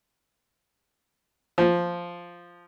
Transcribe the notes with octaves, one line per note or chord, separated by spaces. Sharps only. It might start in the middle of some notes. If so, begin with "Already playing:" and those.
F3